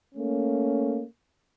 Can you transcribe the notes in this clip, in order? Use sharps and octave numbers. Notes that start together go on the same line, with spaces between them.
A3 A#3 C#4